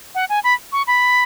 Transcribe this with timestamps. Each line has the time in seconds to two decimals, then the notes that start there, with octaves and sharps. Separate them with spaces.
0.15 F#5
0.29 G#5
0.44 B5
0.72 C#6
0.87 B5